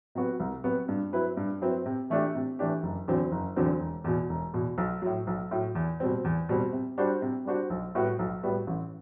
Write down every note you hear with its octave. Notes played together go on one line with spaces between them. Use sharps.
C3 F#3 B3 F#4
C2
C3 F#3 B3 F#4
G2
F#3 C4 E4 B4
G2
F#3 C4 E4 B4
C3
E3 A3 D4 G4
C3
E3 A3 D4 G4
F#1
E2 D3 F#3 C4
F#1
E2 D3 F#3 C4
E1
E2 B2
E1
E2 B2
B1
A2 F#3
B1
A2 F#3
E2
B2 G3 C4
E2
B2 G3 C4
C3
G3 D4 F#4 C5
C3
G3 D4 F#4 C5
B1
A2 G3 B3 F#4
B1
A2 G3 B3 F#4
A1